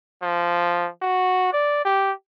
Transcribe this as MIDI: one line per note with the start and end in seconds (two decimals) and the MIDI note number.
0.22 0.88 53
1.02 1.48 66
1.53 1.81 74
1.85 2.12 67